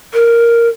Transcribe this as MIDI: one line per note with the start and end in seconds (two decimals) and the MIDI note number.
0.13 0.68 70